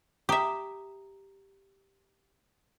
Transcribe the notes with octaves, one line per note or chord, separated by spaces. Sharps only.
G4 E5 A#5 D#6